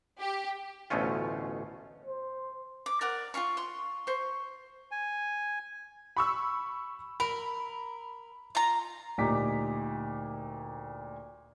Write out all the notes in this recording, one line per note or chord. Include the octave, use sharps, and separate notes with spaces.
G4
A1 D2 B2 A3 C#4 F4
C5
D6
A#4 D5 F#5
F4 G#4 F5 C#6
C6 C#6
C5 C#6
G#5
B5 C#6 E6
A#4 B5
F4 A#5
D2 A#2 D#4 G4 D6 B6